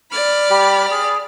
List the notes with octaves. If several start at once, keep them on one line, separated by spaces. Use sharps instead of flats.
D5 B5 F6
G3 G4
G#4